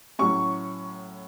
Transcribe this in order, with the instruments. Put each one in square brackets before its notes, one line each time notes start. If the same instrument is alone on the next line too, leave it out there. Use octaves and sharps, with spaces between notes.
[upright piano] A2 F#3 C#4 C#6